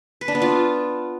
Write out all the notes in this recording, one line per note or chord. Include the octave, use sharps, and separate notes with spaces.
B4
D4
B3
F4